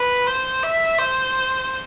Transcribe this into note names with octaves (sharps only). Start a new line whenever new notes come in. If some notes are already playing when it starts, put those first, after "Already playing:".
Already playing: B4
C5
E5
C5